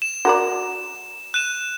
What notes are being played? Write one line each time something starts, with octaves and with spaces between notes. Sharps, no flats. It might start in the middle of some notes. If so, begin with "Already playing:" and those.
E7
F#4 A#4 D5
F#6 D#7 E7